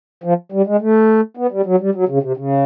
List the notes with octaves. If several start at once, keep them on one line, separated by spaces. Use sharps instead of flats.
F3
G3
G#3
A3
B3
G3
F#3
G3
F#3
C#3
C3
C#3